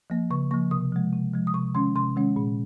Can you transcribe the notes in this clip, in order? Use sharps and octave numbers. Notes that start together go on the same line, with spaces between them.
F3 A#3
C#3 C#6
F3 A#3 C#6
C3 D#6
F3 G#3
C3
F3 G#3
D#6
C3 C#6
D#3 G#3 C#4 C6
C3 C6
D#3 G#3 C#4
A#2